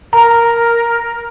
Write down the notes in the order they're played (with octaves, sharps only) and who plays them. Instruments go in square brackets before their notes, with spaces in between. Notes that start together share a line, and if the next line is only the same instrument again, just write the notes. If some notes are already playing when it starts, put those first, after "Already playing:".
[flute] A#4 [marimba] A#5